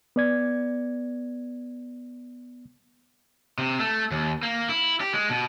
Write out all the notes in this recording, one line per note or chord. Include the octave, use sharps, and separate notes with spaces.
B3 D5 G#6
C3
A3
D#2
A#3
E4
G4
G#3
B2